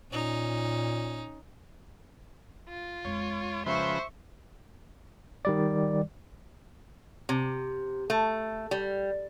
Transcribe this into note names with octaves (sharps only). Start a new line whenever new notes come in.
A#2 C#4 D#4
F4
F2 G#3 C#5
C#3 F3 B4 C5 E5 C#6
D#3 G3 D5
C3
A3
G3